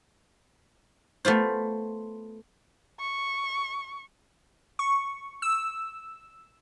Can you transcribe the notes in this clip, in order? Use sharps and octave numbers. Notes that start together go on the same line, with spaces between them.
A3 B3 F4 C5
C#6
C#6
E6